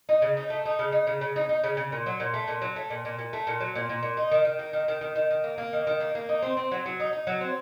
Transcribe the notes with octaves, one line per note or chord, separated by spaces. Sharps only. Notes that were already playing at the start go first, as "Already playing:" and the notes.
D#4
C#3
D#4
A3
D#4
C#3
D#4
C#3
C#3
D#4
D#4
C#3
C#3
A#2
F#3
A#2
A3
A#2
F#3
A3
A#2
A#2
A#2
A3
A#2
F#3
A#2
A#2
A#2
D#4
D#3
D#3
A#3
D#3
D#3
D#3
D#3
D#3
A#3
A#3
D#3
D#3
A#3
A#3
D#4
C4
C4
F#3
F#3
D#4
D#4
F#3
C4